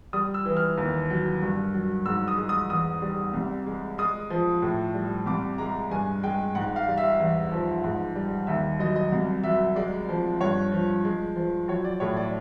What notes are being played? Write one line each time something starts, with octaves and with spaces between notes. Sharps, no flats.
G3 D#6
E6
E3
F6
D#2
F#3
G2
F#3
G#2 E6
D#6
G#3
D#6
E2 D#6
G3
C2
G#3
G#3 D#6
F3
A2
G3
C2 D6
G#3 A#5
G2 G#5
G#3 G5
G#2 F#5
F5
G3
E5
E2
F3
G#2
G3
D#2 E5
F#3 D#5
D#5
C2
F#3 E5
G#3 D5
F3
G2 C#5
F3
G#3
F3
F#3 C#5
D5
A2 C#5
D5